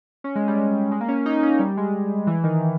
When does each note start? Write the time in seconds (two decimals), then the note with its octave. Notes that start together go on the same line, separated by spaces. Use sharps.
0.24 C#4
0.36 G#3
0.48 G3
0.92 G#3
1.01 A#3
1.08 C#4
1.26 D#4
1.43 C#4
1.59 G3
1.77 G#3
2.27 E3
2.44 D#3